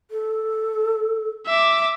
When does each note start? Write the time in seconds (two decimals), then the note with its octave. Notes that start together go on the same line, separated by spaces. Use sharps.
0.11 A4
1.46 E5 D6